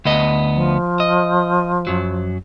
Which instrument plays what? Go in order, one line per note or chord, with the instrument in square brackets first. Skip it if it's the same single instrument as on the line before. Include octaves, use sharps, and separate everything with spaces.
[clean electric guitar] D2 B3 D#5
[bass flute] F3
[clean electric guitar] D#5
F#2 F#3